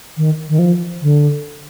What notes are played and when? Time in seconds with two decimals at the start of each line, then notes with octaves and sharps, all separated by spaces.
0.17 D#3
0.49 D#3
0.59 F3
1.02 D3